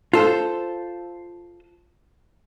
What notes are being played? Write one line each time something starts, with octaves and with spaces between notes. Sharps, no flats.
F4 A4 C5